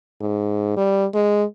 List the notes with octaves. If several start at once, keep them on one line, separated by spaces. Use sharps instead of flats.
G#2
G3
G#3